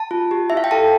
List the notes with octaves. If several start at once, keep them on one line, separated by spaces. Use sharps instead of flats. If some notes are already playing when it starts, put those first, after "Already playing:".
Already playing: A5
F4
G4
E4 E5
F5
G5
A4 A5